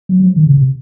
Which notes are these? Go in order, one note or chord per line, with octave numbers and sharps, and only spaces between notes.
F#3
F#3
F3
D#3
C#3
C3